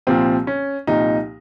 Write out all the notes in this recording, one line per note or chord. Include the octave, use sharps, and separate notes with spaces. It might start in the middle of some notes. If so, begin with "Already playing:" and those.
C2 A#2 F3 C4
C#4
C2 A#2 F3 D#4